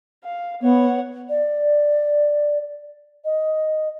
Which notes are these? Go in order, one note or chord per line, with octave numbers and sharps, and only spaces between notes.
F5
B3 C#5 F#5
D5
D#5